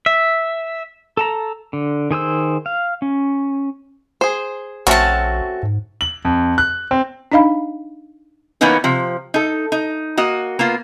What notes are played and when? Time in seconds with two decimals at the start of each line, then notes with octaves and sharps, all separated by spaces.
0.06 E5
1.17 A4 A5 A#5
1.73 D3
2.11 D#3 G#4 C5 E6
2.66 F5
3.02 C#4
4.21 G#4 C5
4.87 A#1 A3 C4 C#4 F#4 A5
5.63 G#2
6.01 F#7
6.25 F2
6.58 F#6
6.91 C4
7.32 D4 D#4 D#5 F5 B5
8.61 E3 A#3 B3 C#4 D#4 B4
8.84 C3 F3
9.34 D#4 A4
9.72 D#4
10.17 A#3 F#4 D#5
10.59 A#3 B3 F4